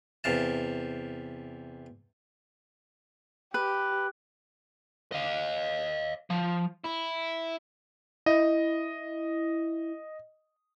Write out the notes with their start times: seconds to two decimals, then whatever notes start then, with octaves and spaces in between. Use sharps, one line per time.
0.24 E2 C3 F5 A5
3.54 G4 B4 F#6
5.12 D#5 F5
6.30 F3
6.85 E4
8.26 E4 D#5